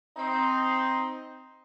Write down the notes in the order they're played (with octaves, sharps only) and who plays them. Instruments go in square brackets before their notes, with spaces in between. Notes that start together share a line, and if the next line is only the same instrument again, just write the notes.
[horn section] C4 D#4